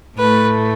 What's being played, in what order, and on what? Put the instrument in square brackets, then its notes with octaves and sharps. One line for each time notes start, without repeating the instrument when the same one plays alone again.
[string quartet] A2 A3 B4